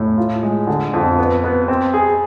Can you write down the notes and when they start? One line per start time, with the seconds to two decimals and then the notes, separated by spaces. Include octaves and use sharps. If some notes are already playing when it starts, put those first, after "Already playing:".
Already playing: A2
0.17 F4
0.43 G#3
0.67 D3
0.93 F2
1.18 B3
1.44 B3
1.68 C4
1.94 G#4